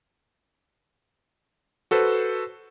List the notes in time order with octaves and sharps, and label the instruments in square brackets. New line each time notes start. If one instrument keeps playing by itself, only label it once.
[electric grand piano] F#4 A4 B4 C5